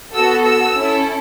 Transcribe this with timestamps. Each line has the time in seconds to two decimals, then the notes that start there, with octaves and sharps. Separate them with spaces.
0.14 B3 F#4 A4 E6
0.46 E6
0.76 C#4 E4 A4